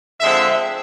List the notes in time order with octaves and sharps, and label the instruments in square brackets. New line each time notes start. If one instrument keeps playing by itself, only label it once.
[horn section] D3 F3 G#3 C4 E5